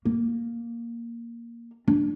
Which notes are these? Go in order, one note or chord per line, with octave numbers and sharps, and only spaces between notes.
A#3
D4